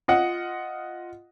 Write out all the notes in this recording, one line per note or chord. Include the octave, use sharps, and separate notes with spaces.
F4 D#5 F#5